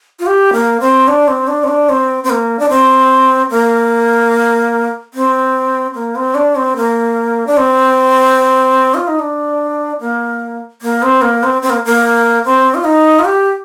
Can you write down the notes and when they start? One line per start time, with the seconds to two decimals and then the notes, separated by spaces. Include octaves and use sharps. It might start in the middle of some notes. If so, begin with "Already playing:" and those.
0.19 F4
0.26 G4
0.53 A#3
0.80 C4
1.08 D4
1.28 C4
1.48 D4
1.64 C4
1.68 D4
1.89 C4
2.24 C4
2.30 A#3
2.59 D4
2.69 C4
3.50 A#3
5.14 C4
5.95 A#3
6.15 C4
6.35 D4
6.56 C4
6.76 A#3
7.47 D4
7.57 C4
8.94 F4
9.08 D#4
9.19 D4
10.00 A#3
10.82 A#3
11.03 C4
11.22 A#3
11.43 C4
11.62 C4
11.70 A#3
11.86 A#3
12.45 C4
12.75 F4
12.84 D#4
13.19 F4
13.25 G4